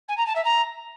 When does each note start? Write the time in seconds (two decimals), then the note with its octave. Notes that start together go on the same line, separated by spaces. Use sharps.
0.08 G#5
0.17 A#5
0.26 A5
0.35 E5
0.45 A#5